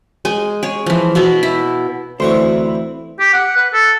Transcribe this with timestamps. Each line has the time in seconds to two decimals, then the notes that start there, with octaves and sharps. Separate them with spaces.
0.25 G#3 G#5
0.63 G#4 C#5
0.86 E3 F3
1.15 B2 B3 E4 F5
1.43 E4
2.20 D2 E3 C4 E4 F#4 C5
3.19 G4
3.33 F#5
3.57 B4
3.73 A4